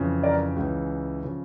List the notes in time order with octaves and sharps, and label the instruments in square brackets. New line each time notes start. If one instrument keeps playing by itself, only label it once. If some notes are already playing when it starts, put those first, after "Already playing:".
Already playing: [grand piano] F2 C#3 E3
A#4 D5
C#2 C#3 E3
C#3 F3